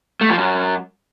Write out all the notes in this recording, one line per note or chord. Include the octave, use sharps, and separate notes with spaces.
A3
F3
F#2